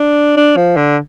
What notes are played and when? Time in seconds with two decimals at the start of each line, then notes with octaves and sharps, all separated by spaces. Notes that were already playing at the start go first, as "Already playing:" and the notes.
Already playing: D4
0.37 D4
0.57 F3
0.77 D3